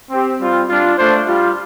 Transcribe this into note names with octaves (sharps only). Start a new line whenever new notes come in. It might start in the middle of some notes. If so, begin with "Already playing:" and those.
C4 G4
G3 C4 F4
G3 D4 F4
A3 D4 F4 C5
G3 F4